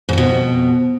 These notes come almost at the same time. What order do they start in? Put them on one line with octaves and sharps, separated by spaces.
G#2 F2 B2